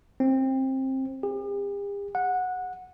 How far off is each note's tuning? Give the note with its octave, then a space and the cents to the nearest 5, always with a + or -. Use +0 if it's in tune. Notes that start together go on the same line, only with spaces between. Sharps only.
C4 +20
G4 +45
F#5 -15